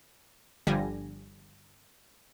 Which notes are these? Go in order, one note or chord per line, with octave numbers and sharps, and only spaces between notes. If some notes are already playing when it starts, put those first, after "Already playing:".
G1 D3 F3 G3 G#5 A#6